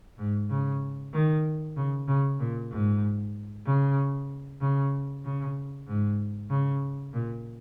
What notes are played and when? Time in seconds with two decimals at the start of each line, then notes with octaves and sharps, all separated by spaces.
0.18 G#2
0.50 C#3
1.13 D#3
1.76 C#3
2.08 C#3
2.39 A#2
2.71 G#2
3.66 C#3
4.61 C#3
5.25 C#3
5.88 G#2
6.50 C#3
7.14 A#2